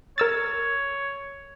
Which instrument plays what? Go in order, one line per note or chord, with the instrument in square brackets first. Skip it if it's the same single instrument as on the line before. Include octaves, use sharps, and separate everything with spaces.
[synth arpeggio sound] A#4 E6 A6 [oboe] C#5